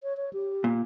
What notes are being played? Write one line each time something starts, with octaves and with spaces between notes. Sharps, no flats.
C#5
C#5
G4
A#2